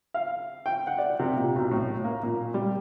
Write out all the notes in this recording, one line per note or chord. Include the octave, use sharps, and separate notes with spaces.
F5
G5
F#5
D5
C3
A#2
B1
A2
A#3
A#2
G3